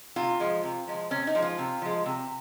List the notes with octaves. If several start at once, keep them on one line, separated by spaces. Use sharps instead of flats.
C3 F4
F3 G#3
C3
F3 G#3
C3 C#4
D#4
F3 G#3
F4
C3
F3 G#3
C3